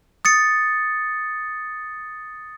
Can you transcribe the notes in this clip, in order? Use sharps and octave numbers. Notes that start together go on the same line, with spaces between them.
D#6 A6 C#7